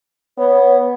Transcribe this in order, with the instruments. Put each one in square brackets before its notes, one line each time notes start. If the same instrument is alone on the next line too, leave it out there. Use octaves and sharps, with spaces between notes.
[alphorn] B3 [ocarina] C#5